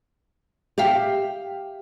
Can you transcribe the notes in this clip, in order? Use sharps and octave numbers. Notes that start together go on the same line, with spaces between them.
G4 E5 F5 G5